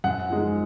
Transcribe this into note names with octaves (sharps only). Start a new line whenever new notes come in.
F#2 F#5
F3 G#3 D#4